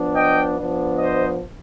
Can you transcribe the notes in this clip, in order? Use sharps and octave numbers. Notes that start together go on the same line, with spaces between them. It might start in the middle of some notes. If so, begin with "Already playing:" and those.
Already playing: F3 B3 D4
D#5 G5
F3 B3 D4
C5 D#5